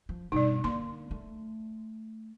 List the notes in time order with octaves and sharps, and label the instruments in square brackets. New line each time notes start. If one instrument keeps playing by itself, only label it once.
[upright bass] F3
[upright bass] G2 B2 [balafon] D#4 D5
[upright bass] D3 A#3 [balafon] C6
[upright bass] A3